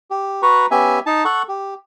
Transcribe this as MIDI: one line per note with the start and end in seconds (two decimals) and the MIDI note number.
0.11 0.42 67
0.42 0.66 66
0.42 0.66 71
0.42 0.66 82
0.42 0.66 85
0.71 0.99 59
0.71 0.99 61
0.71 0.99 67
0.71 0.99 76
0.71 0.99 80
1.06 1.24 63
1.06 1.24 81
1.25 1.42 69
1.25 1.42 78
1.25 1.42 85
1.49 1.74 67